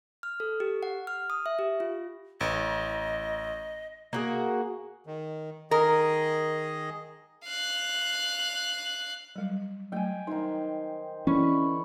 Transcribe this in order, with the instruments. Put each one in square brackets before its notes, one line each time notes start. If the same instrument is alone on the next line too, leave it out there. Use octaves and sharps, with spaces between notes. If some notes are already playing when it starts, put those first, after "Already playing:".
[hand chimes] F6
A4
G4
F#5
F6
D#6
E5
G4
F4
[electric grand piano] A1 [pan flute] D#5
[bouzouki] A#3 F#4 G#4
[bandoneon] D#3
[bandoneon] D#3 G#4 D#5 [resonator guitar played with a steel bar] A#4
[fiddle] F5 F#6
[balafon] F#3 G3
[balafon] F#3 A3 [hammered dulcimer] G5 G#5
[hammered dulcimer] D#3 C5 [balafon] D#4
[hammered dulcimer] D3 B5 C#6 [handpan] E3 [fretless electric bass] C#4